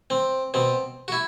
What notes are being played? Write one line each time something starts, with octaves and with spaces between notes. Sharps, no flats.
C4
B2 C4
F#4
E4